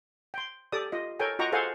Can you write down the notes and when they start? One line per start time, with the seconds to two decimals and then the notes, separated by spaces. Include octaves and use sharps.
0.34 G5 C6
0.72 G4 A4 D5 D#6
0.92 F4 D#5
1.20 A4 A#4 C#5 G5 G#5
1.39 F4 F#4 D#5 G5 A#5 C#6
1.52 G#4 A4 C5 F5 F#5 G#5